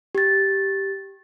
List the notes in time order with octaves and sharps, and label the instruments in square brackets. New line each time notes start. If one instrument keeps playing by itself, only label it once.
[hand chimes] G4 A6